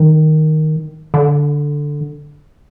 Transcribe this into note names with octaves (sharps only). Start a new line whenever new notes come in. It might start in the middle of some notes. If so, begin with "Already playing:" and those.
Already playing: D#3
D3